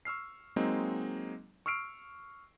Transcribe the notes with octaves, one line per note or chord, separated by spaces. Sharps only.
C#6 E6 F6 C7
F#3 G#3 A#3 C4 D#4
C#6 E6 F6 C7 D7